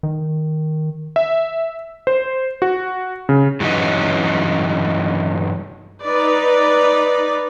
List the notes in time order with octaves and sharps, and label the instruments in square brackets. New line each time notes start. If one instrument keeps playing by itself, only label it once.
[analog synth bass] D#3
[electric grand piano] E5
C5
F#4
C#3
[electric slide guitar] G2 E3 F#3 C#4 D#4
[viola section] D#4 B4 D5